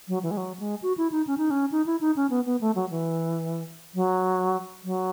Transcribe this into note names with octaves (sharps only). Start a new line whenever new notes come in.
F#3
E3
G#3
F#3
G#3
F#4
E4
D#4
C#4
D#4
C#4
D#4
E4
D#4
C#4
B3
B3
A3
F#3
E3
F#3
F#3